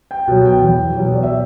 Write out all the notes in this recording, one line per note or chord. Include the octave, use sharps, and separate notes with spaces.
G5
B2 F#3
G5
E2
B2 F#3
D5
E5